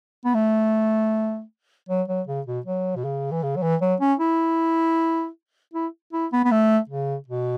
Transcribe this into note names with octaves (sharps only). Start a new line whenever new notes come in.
B3
A3
F#3
F#3
C#3
B2
F#3
B2
C#3
E3
C#3
F#3
E3
F#3
C#4
E4
E4
E4
B3
B3
A3
C#3
B2